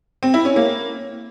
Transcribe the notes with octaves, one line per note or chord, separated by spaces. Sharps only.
C4
E4
C#4
A#3